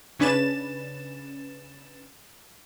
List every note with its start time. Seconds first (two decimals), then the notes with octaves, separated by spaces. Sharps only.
0.19 C#3 C#4 D4 B4 A6 E7